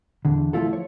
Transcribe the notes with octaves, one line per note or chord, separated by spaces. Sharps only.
E2 D3
F3 A3 A#3 E4 F4 A4
C#5